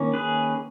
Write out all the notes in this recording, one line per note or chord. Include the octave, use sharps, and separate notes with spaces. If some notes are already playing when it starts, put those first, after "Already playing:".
Already playing: D#3 A#3 C#4
G#4 B4